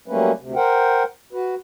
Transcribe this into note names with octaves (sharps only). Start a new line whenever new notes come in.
F#3 G3 A3 A#3 C#4 B4
D2 C3
A#4 C5 F#5 G5
F#4 B4